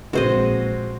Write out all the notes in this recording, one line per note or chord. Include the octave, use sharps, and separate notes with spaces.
A#1 G#3 C4 F#4 C5 D#5